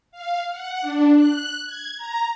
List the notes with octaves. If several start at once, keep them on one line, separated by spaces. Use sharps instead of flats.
F5
F#5
D4
F#6
G#6
A#5